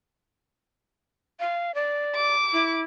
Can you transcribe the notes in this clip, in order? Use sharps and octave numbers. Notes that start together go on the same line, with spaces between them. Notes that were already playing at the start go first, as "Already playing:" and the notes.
F5
D5
D6
E4